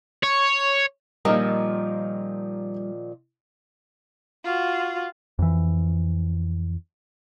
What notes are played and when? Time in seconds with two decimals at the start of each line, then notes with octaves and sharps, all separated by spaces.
0.23 C#5
1.25 A#2 D#3 F3 G3 A#3 D#4 A#4
4.44 F4 F#4
5.39 F2 E3